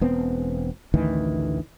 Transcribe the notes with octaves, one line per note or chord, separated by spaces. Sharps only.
E1 B3 C4
A1 D2 D#3 E3